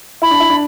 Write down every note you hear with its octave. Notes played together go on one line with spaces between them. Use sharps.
E4 B5
D4
E4
D4